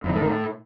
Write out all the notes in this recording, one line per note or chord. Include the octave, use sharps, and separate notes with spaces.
F2
E3
A2
D#3
A2